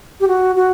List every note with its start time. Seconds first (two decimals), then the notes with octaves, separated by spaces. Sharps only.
0.20 G4
0.28 F#4
0.56 F#4